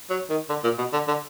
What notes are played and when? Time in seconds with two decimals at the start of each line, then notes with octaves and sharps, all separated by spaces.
0.10 F#3
0.30 D#3
0.49 D3
0.64 A#2
0.78 B2
0.93 D3
1.08 D3